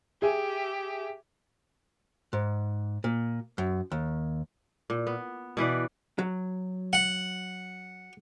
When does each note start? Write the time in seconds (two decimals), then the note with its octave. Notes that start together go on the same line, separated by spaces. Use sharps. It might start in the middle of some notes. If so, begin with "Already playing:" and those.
0.22 G4 G#4 E5 G#5
2.33 G#2
3.04 A#2
3.58 F#2
3.92 D#2
4.90 A#2
5.07 B3
5.57 B2 E3 B4 D5
6.19 F#3
6.93 F#5